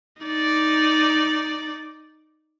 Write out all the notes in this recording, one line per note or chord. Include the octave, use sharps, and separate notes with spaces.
D#4 D5